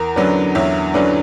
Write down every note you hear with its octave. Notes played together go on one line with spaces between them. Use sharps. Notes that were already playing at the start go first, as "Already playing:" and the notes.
Already playing: E2 A#4
D3 F#3 C#4 B4 D5
E2 C#5 E5
D3 F#3 C#4 B4 D5